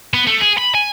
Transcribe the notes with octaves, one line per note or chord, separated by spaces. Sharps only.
B3
A3
G#4
B5
G#5